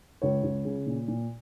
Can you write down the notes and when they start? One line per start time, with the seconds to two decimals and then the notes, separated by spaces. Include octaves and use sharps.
0.22 C#2 C#5
0.43 C#2
0.65 C#3
0.86 A#2
1.08 A#2